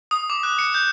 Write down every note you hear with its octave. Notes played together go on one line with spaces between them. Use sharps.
D#6
D6
F#6
C#7
G6